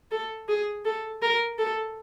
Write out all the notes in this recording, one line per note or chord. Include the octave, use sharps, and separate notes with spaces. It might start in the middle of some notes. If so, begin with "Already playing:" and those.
A4
G#4
A4
A#4
A4